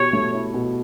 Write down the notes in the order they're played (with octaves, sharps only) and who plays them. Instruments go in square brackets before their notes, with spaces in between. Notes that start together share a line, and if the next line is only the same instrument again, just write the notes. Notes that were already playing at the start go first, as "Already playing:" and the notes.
Already playing: [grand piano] B2 E4 G4 [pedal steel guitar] C#5
[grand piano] A3
E4
B2